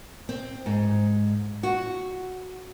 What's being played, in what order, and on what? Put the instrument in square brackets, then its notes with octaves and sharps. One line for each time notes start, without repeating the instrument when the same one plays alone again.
[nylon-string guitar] C4
G#2
F#4